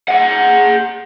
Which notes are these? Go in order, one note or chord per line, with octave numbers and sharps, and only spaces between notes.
G#4 F#5